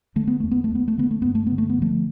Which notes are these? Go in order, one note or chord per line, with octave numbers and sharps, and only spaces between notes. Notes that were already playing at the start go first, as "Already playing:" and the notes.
D3 A3
B3
E2 A3
B3
A3
E2
B3
A3
D3 B3
A3
G2 B3
A3
D3 B3
A3
B3
D3 F3 A3